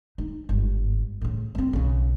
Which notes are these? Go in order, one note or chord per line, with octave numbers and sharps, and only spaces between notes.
D#4
G1 G#2
A2 C#3
A#3 C4
B1 C#3